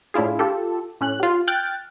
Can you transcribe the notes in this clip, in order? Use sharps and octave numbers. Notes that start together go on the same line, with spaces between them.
A2 D4 E4 F4 G#4
F4 G4 A4
A2 C#4 F#6
F4 G4
G5 F6 F#6 A6